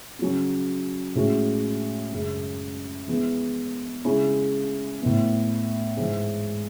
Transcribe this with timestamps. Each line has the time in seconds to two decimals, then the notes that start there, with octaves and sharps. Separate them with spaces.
0.19 C#3 F#3 C#4
1.15 A2 G#3 C#4 F#4
2.12 F#2 C#3 G#3
3.08 E3 G#3 B3
4.05 C#3 G#3 C#4 E4
5.01 A2 E3 B3
5.97 G#2 E3 G#3